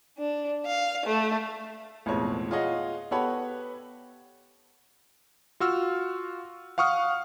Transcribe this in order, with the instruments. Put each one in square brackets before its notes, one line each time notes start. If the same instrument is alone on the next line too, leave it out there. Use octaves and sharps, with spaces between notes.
[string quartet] D4
F5
A3
[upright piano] A1 F2 B2 G#3 C#5
F4 G#4 C#5 D#5 F#5
B3 G4 A4 C#5 F#5 B5
[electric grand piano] F4 F#4 E6 F6
F5 F#5 C#6 D#6 F6